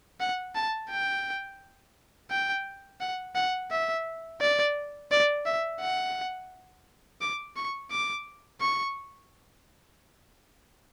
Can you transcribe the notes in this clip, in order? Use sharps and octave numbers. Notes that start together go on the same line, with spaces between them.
F#5
A5
G5
G5
F#5
F#5
E5
D5
D5
E5
F#5
D6
C#6
D6
C#6